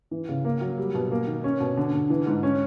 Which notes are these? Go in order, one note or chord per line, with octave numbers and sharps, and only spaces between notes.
E3
C#3
A#3
F#3
G3
B2
A#3
D#3
C#4
B2
D3
D3
E3
G#2
C#4